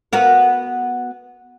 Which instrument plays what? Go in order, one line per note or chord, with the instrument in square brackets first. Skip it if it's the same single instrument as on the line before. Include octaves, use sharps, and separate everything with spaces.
[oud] B3 F#4 A#4